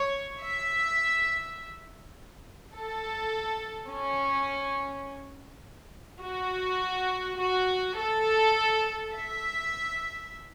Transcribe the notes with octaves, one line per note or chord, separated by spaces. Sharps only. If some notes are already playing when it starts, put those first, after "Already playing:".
Already playing: C#5
E5
A4
C#4
F#4
F#4
A4
E5